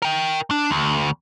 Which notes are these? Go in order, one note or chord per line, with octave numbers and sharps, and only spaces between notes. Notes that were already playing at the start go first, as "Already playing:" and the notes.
A#4 G5
D4
D2